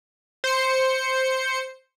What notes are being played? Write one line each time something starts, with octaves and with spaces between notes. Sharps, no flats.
C5 C#7